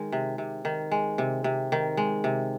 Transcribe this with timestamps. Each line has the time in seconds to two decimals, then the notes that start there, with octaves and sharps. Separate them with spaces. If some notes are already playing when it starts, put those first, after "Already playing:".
Already playing: D#3 G#3
0.13 C3
0.38 C3
0.65 D#3
0.92 G#3
1.18 C3
1.44 C3
1.72 D#3
1.97 G#3
2.24 C3